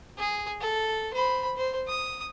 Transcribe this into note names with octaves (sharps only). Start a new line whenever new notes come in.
G#4
A4
C5 B5
C5
D#6